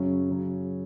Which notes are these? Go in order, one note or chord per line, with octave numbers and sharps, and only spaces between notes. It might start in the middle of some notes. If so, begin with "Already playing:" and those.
Already playing: F#2 C#3 F#3 C#4
C#3 F#3